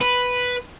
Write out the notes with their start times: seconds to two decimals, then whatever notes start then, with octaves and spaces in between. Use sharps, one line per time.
0.01 B4